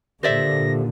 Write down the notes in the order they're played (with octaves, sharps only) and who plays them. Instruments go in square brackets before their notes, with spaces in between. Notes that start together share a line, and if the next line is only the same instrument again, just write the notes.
[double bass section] A#2 D3 [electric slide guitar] G4 A4 [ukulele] C5 D5 E5 [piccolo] A#6